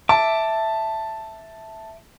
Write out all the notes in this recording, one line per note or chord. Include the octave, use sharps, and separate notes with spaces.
E5 A5 D6